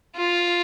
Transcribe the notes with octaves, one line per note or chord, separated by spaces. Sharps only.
F4